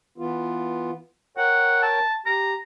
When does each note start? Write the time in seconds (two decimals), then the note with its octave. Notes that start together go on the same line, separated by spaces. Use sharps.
0.18 E3 B3 F4
1.37 A#4 C#5 F#5 G5
1.82 A5
2.26 G4 A#5